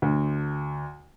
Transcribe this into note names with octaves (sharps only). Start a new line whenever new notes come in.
D2